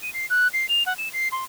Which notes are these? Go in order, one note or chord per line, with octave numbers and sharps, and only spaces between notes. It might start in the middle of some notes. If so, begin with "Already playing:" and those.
D#7
C7
F#6
C7
F7
F#5
E7
C7
C6